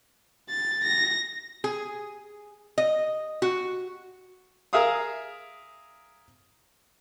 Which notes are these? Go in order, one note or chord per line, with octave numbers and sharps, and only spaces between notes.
A6
A#6
G#4
D#5
F#4
G#4 A#4 E5 F5 D#6